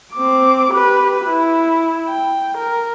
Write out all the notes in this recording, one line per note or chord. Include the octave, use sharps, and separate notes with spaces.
C4 D6
G4 B4
E4
G5
A#4